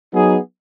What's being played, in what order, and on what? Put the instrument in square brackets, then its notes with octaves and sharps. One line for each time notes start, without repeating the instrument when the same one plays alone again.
[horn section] F#3 B3 D#4 G#4